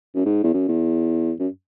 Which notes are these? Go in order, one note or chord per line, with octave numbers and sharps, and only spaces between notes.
F#2
G#2
E2
F#2
E2
F#2